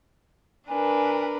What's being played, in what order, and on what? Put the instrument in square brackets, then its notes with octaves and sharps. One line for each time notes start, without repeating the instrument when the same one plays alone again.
[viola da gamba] D4 A#4 B4 [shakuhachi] G#5